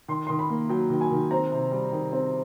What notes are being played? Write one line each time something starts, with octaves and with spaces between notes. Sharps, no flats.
D#3 C6
D#3 C6
B5
A#3
F#3 G5
D#3
G#5
D#3
C4 A#5
C3
G3
D#3
C4